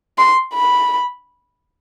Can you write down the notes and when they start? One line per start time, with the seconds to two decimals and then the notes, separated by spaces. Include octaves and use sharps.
0.18 C6
0.54 B5